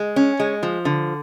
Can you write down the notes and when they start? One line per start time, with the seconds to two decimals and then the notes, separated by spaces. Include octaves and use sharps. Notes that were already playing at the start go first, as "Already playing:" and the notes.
Already playing: G#3
0.16 C#4
0.40 G#3
0.63 F3
0.85 D3